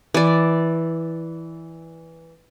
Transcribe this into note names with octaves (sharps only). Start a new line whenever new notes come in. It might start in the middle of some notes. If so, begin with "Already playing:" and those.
E3 D5